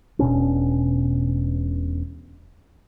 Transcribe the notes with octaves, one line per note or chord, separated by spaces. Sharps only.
E1 B2 C#4 D4